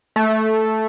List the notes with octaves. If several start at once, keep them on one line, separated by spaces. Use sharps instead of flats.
A3